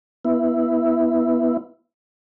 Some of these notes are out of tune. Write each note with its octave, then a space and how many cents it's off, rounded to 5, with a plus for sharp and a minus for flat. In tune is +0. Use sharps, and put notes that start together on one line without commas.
B3 -10 E4 +0